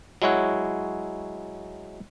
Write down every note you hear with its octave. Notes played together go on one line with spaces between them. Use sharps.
F#3 G#3 E4 C#5 F#5